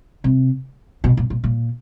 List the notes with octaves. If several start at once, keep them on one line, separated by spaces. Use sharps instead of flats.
C3
B2
A#2
A#2
A#2